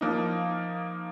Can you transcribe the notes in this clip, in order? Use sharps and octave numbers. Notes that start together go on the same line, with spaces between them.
F3 A#3 D#4